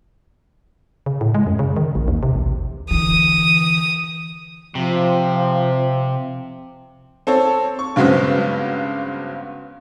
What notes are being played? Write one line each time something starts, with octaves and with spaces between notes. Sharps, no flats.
C#3
A2
G#3
F#2
C#3
D#3
A1
D#2
C3
A1
D3 E3 D#6
C3 F3
C4 A4 C#5
C#6
G2 C#3 F#3 G#3 B3 C4